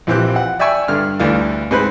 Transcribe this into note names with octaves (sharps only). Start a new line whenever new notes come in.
A#1 E3 C4 G4 F#6
F#5
D5 E5 G5 G#5 C#6 E6
G2 D3 F6
D2 E3 G3 D4 F5
G#2 G#3 C4 B4 B5 F#6